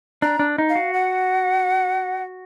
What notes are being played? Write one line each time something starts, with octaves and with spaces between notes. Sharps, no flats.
D4 A#5
D4
D#4
F5
F#4
F#5